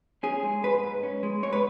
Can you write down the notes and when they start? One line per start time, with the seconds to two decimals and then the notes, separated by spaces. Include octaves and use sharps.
0.23 C#4 G#4
0.43 G#3
0.63 G#2 B4
0.84 G#2
1.03 C#4
1.23 G#3
1.43 G#2 C#5
1.53 B4